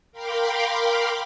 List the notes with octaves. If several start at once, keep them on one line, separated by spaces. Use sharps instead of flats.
A#4 F5 G5 B5 C6 D6